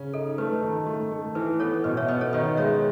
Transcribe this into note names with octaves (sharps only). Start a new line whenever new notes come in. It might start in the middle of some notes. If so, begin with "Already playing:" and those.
Already playing: C#3 C#4
D#4 A4
A3 B4
D#3
A3
A3
E3 B4
B3 A4 C#5
B2 B4 D#5
C#5 E5
B3 B4 D#5
A4 C#5
D#3 B4 D#5
G#3 C#5 E5